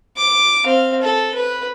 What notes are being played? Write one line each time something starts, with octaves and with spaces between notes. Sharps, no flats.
D6
C4 F5
A4
B4